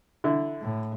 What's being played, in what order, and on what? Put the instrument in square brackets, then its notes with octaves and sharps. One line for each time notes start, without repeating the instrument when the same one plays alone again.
[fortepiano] D3 E4
[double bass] A2